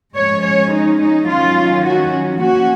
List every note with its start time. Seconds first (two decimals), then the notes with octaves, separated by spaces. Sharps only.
0.16 F3 G#3 C#4 C#5
0.44 C#5
0.73 D#4
1.00 D#4
1.29 D#3 F#3 C#4 F4
1.85 F#4
2.41 F3 A#3 C#4 F#4